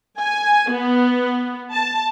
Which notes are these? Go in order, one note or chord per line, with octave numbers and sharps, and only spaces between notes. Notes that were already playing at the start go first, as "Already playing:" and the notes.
G#5
B3
A5